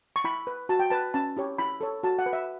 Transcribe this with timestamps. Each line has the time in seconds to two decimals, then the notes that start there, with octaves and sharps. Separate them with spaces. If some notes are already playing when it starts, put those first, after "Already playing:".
0.16 C#6
0.24 E4 B5
0.47 B4
0.69 F#4 A5
0.79 G5
0.90 B4 A5
1.14 C#4 A5
1.37 E4 G4 C#5
1.58 E4 B5
1.81 A4 C#5
2.03 F#4 A5
2.19 F#5
2.26 B4
2.33 E5